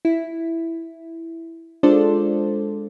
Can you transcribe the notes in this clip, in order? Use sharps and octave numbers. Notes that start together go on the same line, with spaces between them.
E4
G#3 D4 F4 A4 C5 D5